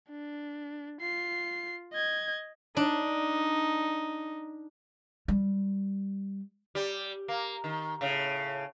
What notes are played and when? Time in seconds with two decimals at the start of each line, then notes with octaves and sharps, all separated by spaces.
0.10 D4
1.01 F4 C7
1.93 D#5 G#6
2.77 D4 D#4
5.28 G3
6.75 G3
7.28 A#3
7.64 D#3
8.01 A2 C#3